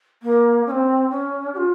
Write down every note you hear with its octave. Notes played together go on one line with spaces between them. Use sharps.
A#3
C#4
C4
C#4
G4
F4